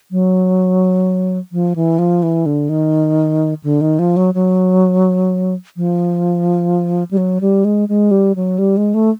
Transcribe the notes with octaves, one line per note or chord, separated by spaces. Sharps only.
F#3
F3
E3
F3
E3
D3
D#3
D3
D#3
F3
F#3
F#3
F3
G3
F#3
G3
G#3
G#3
G3
F#3
G3
G#3
A3